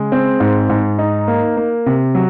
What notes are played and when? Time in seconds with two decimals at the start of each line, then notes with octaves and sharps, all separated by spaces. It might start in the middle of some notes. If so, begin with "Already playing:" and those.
Already playing: C#3 G#3
0.12 C4
0.40 G#2
0.70 G#2
0.99 D#4
1.28 A#3
1.57 A#3
1.86 C3
2.15 F#3